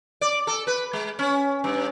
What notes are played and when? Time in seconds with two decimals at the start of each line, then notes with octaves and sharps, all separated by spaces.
0.21 D5
0.47 A4
0.67 B4
0.93 G#3
1.19 C#4
1.64 G2